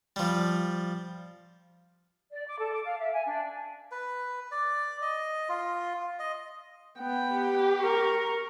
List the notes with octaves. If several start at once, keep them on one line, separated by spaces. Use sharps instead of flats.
F3 G3
D5
D6
A4
D6
F5
E5
G#5
D4
B4
D5
D#5
F4
D#5
B3 G5
G4
A#4 C#6